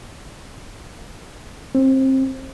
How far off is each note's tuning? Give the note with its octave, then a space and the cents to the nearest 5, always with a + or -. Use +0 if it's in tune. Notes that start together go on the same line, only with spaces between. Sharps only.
C4 +25